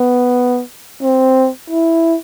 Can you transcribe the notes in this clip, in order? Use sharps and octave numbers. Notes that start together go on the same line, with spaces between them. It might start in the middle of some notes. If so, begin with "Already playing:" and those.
Already playing: B3
C4
E4